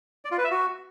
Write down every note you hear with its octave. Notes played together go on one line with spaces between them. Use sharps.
D5
F4
B4
E5
F#4